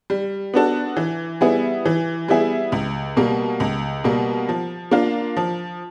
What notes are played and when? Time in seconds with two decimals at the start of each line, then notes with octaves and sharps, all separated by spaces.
0.10 G3
0.54 B3 D4 F#4 A4
0.96 E3
1.41 G3 B3 E4 G#4
1.85 E3
2.28 G3 B3 E4 G#4
2.72 C#2
3.17 B2 G3 A#3
3.60 C#2
4.04 B2 G3 A#3
4.49 F3
4.91 A#3 D4 F4
5.37 F3